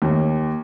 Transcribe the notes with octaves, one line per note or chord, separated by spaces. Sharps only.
D#2